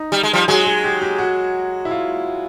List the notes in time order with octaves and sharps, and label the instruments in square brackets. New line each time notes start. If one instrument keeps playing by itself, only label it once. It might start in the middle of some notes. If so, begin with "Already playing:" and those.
Already playing: [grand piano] D#4
[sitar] G3
G#3
F3 G3
[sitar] F#3 G#3 [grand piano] G#4
[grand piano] G#4
G4
G4
F#4
E4
F4